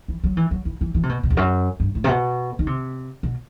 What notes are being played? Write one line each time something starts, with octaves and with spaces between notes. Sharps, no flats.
E3
F#3
E3
F#3
E3
E3
E3
C3
B2
B2
E2
F#2
G2
A2
C3
B2
D#3
C3
B2